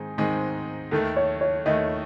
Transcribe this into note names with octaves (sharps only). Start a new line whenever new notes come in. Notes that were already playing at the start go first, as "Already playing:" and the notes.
Already playing: G#2 D#3 C4 D#4 G#4
G#2 D#3 G#3 C4 D#4
D#2 D#3 A3 A4
C#5
C#5
D#2 D#3 A3 D#5